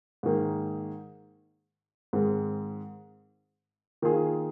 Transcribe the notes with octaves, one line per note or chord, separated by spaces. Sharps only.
G#2 D#3 A#3
G#2 D#3 G#3 C4
D#3 A#3 F4 G#4